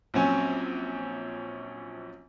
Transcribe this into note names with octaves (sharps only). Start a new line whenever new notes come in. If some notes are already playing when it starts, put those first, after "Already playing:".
A#1 F#3 C4 C#4 G#5